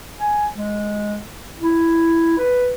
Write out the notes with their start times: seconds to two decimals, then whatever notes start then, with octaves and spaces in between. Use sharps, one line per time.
0.19 G#5
0.55 G#3
1.60 E4
2.38 B4